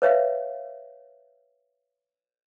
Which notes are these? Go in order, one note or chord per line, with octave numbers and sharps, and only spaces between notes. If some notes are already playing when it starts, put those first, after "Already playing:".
B4 C#5 E5 F5